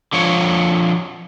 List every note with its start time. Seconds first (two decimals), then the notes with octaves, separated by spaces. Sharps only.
0.13 D3 F3 C#5